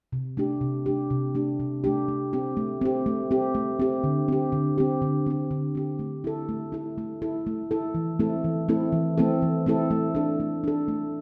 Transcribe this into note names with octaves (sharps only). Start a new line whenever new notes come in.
C3
A3 D4 G4
C3
A3 D4 G4
C3
A3 D4 G4
C3
A3 D4 G4
A3
C4 G4
A3
C4 G4
A3
C4 G4
A3
C4 G4
D3
C4 G4
D3
C4 G4
D3
C4 G4
D3
C4 G4
A3
E4 A4
A3
E4 A4
A3
E4 A4
A3
E4 A4
E3
A3 C4 E4 A4
E3
A3 C4 E4 A4
E3
A3 C4 E4 A4
E3
A3 C4 E4 A4
A3
D4 A4
A3
D4 A4
A3